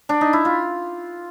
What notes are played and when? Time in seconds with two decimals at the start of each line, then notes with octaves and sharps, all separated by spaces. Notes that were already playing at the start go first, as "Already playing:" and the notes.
0.09 D4
0.21 D#4
0.33 E4
0.45 F4